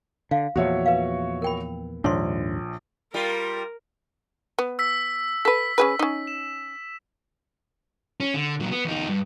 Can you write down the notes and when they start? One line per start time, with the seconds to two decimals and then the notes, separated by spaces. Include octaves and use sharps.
0.31 D3 F5
0.56 E2 A#2 F3 F#4 C#5 E5
0.86 B4 F5
1.42 A#4 G5 B5
2.04 A#1 D#2 G#2 D4 C#5 C6
3.14 G3 F4 A#4
4.59 B3
4.79 E6 B6
5.45 A4 B4 B6
5.78 C#4 G#4 B4
5.99 C#4 D#4
6.27 E7
8.20 C#4
8.34 D3
8.60 A#2 F#3
8.71 B3
8.85 E2 D#4
9.09 G2